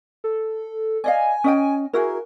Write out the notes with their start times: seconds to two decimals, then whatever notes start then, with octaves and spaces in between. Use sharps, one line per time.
0.24 A4
1.04 D5 D#5 F5 G#5
1.44 C#4 D#5 G5
1.93 E4 F#4 G#4 A#4